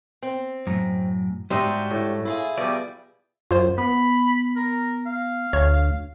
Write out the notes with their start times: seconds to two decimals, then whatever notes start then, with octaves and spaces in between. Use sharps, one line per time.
0.22 C4
0.67 F#2 A2 A#5
1.50 G#2 G3 D4 D#4 F#4 G4 E5 C6
1.91 A2
2.25 E4 F4 G#4
2.58 B2 G3 D5
3.51 F#2 F4 C5
3.78 B3 B5
4.56 A#4
5.06 F5
5.53 D2 C#5